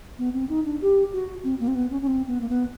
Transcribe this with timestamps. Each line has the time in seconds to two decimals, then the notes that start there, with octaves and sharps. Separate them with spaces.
0.18 B3
0.34 C4
0.49 D#4
0.65 D4
0.82 G4
1.13 F#4
1.44 C4
1.60 A#3
1.68 C4
1.75 B3
1.91 C#4
2.01 C#4
2.07 C4
2.27 B3
2.41 A#3
2.49 B3